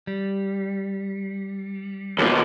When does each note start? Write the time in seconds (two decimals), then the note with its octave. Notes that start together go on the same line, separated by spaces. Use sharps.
0.07 G3
2.18 D#2 B2